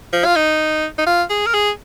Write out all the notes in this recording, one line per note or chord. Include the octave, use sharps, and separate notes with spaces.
F3
F4
D#4
D#4
F4
G#4
A#4
G#4